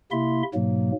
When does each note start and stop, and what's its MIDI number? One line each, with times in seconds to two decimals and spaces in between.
0.12 0.43 48
0.12 0.43 58
0.12 0.43 64
0.12 0.43 76
0.12 0.43 84
0.54 0.92 44
0.54 0.92 47
0.54 0.92 54
0.54 0.92 58